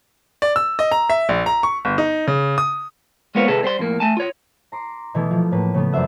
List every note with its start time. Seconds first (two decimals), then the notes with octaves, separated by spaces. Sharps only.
0.42 D5
0.56 E6
0.79 D#5
0.92 A#5
1.10 E5
1.29 A#1
1.46 A#5
1.63 C#6
1.85 G1
1.98 D#4
2.27 C#3
2.58 D#6
3.35 G#3 A#3 B3 F4 C5 C#5
3.48 C3 G#4 A4 B4
3.63 G3 C5 G5 C6
3.79 F2 A2 A#3
4.00 A3 G#5 A5
4.17 F4 C#5
4.72 A#5 C6 D6
5.14 B2 E3 A3 B3 E4
5.31 F3
5.52 A2 A#3 B4
5.74 C#3 A3 B3
5.92 F#2 D4 C5 E5 F#5